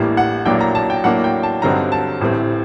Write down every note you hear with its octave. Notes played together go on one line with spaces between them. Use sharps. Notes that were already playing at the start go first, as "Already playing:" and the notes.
Already playing: A1 A2 G3 A#3 D4
F#5
A#1 A2 F#3 A#3 D4 G5
A#5
A5
G5
A2 F#3 A#3 D4 F#5
G5
A5
G2 D3 F#3 C4 D#4 A#5
A5
A1 A2 G3 C4